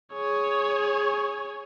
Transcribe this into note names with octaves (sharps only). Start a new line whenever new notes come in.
G#4 C#5